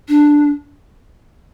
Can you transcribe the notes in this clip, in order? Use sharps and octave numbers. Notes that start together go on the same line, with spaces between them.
D4